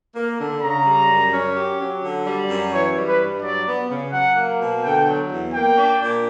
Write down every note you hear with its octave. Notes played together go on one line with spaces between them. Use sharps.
A#3
D3
C#3 A#5
G3
F#2
C#4
G4
F#3
D3
G3
F#2
E3 C#5
G3
B4
G2
F#3 D5
B3
C#3
F#3 F#5
A#3
B2
D3 G5
F#3
E2
A#3 G5
D4
A#2